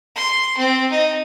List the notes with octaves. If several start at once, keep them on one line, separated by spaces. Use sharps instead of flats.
C6
C4
D#4